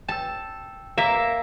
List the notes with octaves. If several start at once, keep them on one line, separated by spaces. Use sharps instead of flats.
G5 A5 E6
A#3 E5